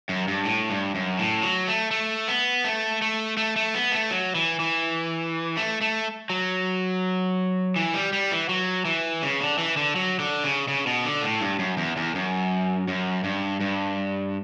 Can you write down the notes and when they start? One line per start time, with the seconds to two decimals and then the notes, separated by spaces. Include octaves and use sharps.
0.09 F#2
0.27 G2
0.45 A2
0.70 G2
0.95 F#2
1.19 A2
1.43 F#3
1.68 A3
1.91 A3
2.28 B3
2.64 A3
3.02 A3
3.37 A3
3.56 A3
3.74 B3
3.92 A3
4.11 F#3
4.35 E3
4.60 E3
5.57 A3
5.81 A3
6.30 F#3
7.76 E3
7.94 G3
8.13 G3
8.31 E3
8.49 F#3
8.85 E3
9.23 C#3
9.41 D3
9.58 E3
9.77 D3
9.96 F#3
10.20 D3
10.44 C#3
10.68 C#3
10.87 B2
11.05 D3
11.23 A2
11.41 G2
11.59 F#2
11.77 E2
11.97 E2
12.15 F#2
12.88 F#2
13.24 G2
13.60 G2